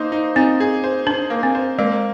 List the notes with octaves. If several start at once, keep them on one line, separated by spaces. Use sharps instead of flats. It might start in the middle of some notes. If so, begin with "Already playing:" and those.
Already playing: A#3 D#4 C5
D#4
C4 D#4
G#4
C5
D4 C5
A#3
C4
C5
G#3 A#3